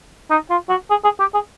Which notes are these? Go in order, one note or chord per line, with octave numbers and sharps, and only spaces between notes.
D#4
F4
F#4
G#4
G#4
G4
G#4